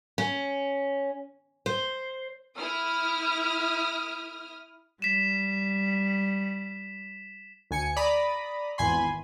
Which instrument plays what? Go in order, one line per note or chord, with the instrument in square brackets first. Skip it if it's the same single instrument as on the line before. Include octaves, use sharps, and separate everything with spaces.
[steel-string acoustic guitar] C#4
C5
[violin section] E4 D#6 F6
[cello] G3 [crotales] B6 E7
[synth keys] D2 G#5 C#7
D5 A#5 B5 D#6
G#1 E2 G#5 B5 C6